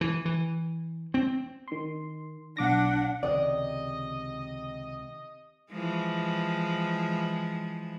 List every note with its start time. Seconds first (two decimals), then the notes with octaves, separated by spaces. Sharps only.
0.01 E3
0.25 E3
1.14 C4
1.68 D#3 C6
2.57 B1 D4 F#5 D6 A#6
3.23 C#2 C3 D#3 D5 D#5
5.71 E3 F3 G#3